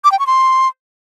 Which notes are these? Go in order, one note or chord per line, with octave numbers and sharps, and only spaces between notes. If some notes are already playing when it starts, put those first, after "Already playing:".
D6
G5
C#6
C6